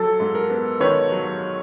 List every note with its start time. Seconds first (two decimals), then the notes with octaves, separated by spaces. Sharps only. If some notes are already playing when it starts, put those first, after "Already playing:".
Already playing: F#3 A4
0.20 G#2
0.35 A#4
0.50 B3
0.80 D#3 B4 C#5
1.12 F#3